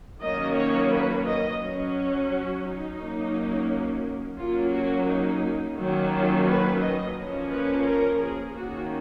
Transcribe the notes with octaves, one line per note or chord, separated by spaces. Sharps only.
D#3 F#3 A#3 C#4 D#5
C#5
B4
D#5
F#3 C#4
F#4
D#4
F#3 A#3 C#4
F#3 A#3 C#4 F4
F#4
D#4
D#3 F#3 A#3 C#4
F4
B4
D#5
F3 A#3 C#4
B4
A#4
G#4
D#3 A#3 C#4 F#4